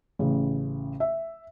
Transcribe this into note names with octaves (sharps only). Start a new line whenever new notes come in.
A1 C#3
E5